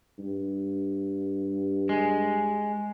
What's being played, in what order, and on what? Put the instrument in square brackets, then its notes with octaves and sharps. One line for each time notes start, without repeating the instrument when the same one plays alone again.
[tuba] G2
[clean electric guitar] G#3